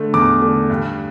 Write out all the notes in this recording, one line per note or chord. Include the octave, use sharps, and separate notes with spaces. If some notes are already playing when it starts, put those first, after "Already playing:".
Already playing: D3 A3
E2 D6
D3 A3
G2